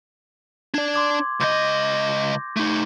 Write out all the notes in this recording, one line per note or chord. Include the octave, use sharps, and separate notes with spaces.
D4 D5 G#6
C6 D6 G#6
C#2 D#5 D6 G6 A#6
A3 D#4